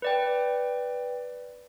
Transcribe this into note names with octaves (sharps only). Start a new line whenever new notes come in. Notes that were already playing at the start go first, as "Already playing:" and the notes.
B4 D5 G5